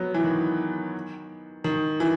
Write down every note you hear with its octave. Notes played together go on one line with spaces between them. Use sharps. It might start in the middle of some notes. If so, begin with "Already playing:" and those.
Already playing: F#3 B3
E3
D#3
D#3
E3